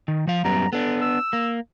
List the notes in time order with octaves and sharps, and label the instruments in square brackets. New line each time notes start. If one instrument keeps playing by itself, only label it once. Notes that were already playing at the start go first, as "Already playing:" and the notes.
[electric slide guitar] D#3
F3 F5
[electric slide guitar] F#2 G3 B3 [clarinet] A#5
[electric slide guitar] B3 D4 [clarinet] A4
[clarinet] E6
[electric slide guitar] A#3